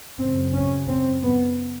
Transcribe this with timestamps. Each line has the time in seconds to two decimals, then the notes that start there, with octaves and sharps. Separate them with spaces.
0.19 F#2 C#3 C4
0.54 C#4
0.88 C4
1.23 B3